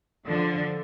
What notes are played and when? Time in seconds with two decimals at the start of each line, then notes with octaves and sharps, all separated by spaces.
0.27 D3 F3